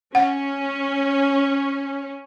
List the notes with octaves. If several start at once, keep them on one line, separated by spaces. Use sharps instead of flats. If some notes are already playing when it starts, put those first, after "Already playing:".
C#4 F#5